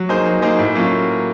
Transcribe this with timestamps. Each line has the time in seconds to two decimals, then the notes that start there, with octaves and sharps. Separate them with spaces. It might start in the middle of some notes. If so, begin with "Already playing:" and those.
Already playing: F#3
0.09 A#3 D#4 G#4 C5
0.26 F#3
0.42 A#3 D#4 G#4 C5
0.59 A2
0.75 F#3 A#3 C#4 F4